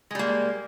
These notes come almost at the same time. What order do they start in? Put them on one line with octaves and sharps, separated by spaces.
G#3 G3 A#3